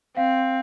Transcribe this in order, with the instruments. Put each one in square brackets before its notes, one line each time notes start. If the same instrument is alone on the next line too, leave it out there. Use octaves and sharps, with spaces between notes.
[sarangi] C4 [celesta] F5